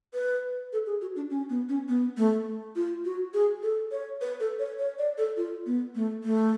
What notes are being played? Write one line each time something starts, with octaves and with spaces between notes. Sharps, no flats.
B4
A4
G#4
F#4
D4
C#4
B3
C#4
B3
A3
F4
F#4
G#4
A4
C#5
B4
A4
C#5
C#5
D5
A4
F4
B3
A3
A3